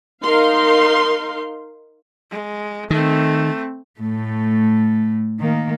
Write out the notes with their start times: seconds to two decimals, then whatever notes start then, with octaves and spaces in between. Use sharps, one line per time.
0.24 D#4 A#4 F5 C6
2.31 G#3
2.90 D#3 A3 C4
4.00 A2 A3
5.40 D#3 A#3